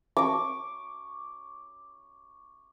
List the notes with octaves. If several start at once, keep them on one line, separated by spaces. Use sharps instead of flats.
C#6 D6